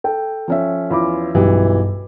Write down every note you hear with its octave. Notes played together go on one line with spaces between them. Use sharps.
A4 G5
F3 C#4 E5
E2 F4 B5 D6
B1 G2 E3 F#3 G4